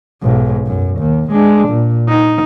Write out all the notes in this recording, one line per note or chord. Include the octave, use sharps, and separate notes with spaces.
B1 G#2
F#2
D#2
G#3 D4
A#2
D#4